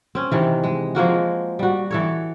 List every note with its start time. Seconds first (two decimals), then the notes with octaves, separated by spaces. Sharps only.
0.15 C4 C#4
0.32 C3 D#3 E3
0.64 G#3
0.95 F3 G#3 A#3 F#4
1.59 G3 F#4
1.91 E3 A4 C#5